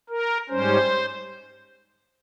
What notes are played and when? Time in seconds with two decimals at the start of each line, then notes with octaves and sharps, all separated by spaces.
0.09 A#4
0.49 G#2 G3 C#4 C5